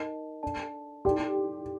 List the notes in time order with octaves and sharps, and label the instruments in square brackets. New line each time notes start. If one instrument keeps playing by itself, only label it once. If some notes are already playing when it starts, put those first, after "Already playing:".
Already playing: [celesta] D#4 A#4 D#5 A5
D4 A4 D5 A5
[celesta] D#4 A4 D5 G5 C6 [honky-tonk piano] G4